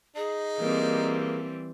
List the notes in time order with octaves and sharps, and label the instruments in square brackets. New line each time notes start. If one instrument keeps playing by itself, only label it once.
[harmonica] D#4 [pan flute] G#4
[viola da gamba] E3 G3 C4 [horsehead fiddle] A#3